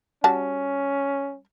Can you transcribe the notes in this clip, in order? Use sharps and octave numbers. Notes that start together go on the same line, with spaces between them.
G3 C#4 F#4 A5